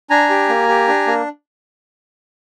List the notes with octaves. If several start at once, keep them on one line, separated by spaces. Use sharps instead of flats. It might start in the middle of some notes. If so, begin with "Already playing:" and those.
D4 G#5 A#5
G4
A#3
G4
D4
A#3